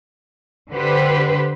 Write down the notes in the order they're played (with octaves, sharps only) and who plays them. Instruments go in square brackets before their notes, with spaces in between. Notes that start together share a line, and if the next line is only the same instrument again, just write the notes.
[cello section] D3 G4 B4 C5